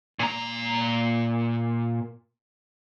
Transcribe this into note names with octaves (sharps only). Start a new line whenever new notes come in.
A#2 A#5